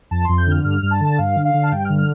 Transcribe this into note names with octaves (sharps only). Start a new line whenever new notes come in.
F2 A5
F2 C6
G6
D3 F6
G2 F6
G2
A5
D3
G2 F5
D3
F5
D3
A5
G2 G5
F6
D3
F6